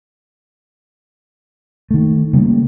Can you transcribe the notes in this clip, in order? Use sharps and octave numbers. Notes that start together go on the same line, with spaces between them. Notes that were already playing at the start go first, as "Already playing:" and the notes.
D#3 A3
C#3 G3 A3 A#3